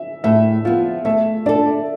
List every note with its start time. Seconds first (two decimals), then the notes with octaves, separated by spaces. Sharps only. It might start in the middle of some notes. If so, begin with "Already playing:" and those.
Already playing: E5
0.24 A2 E5
0.65 F3 B3 F4
1.05 A3 E5
1.46 D4 A4 D5